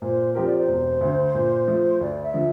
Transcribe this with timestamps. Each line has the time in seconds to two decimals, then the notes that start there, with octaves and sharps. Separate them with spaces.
0.02 A#2 C5
0.34 F3 C4 G4 A#4 C5
0.46 D5
0.58 C5
0.68 E1
1.01 D2 D3
1.34 A#2
1.68 F3 A3
2.01 D2 D5
2.22 E5
2.34 D3 F3